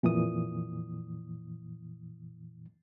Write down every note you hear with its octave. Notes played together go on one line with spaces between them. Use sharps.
F2 A#2 E3 D#6